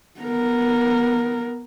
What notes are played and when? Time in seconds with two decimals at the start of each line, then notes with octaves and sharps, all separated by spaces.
0.20 B3 A#4